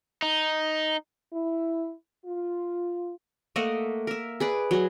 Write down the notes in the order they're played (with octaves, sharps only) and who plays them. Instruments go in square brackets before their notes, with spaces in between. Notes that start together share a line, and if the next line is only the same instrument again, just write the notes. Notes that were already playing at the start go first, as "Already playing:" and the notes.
[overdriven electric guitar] D#4
[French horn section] E4
F4
[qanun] A3 A#3 D#5 F#5
A#4 E5
G#4 B4 D5
F#3 G#4